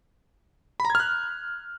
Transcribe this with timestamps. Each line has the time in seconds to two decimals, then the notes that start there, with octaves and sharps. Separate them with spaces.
0.80 B5
0.85 A#5
0.90 G#6
0.95 F6
1.00 F#6